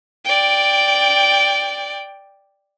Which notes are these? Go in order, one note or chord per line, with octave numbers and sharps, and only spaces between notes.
D5 G5